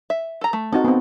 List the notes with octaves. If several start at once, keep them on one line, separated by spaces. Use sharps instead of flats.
E5
A4 A#5
A3
C4 D#4 F#4 A4
B3 C4